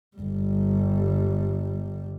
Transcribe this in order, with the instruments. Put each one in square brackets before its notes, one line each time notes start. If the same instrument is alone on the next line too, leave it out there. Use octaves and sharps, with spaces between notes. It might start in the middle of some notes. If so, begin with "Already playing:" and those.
[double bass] G1 G3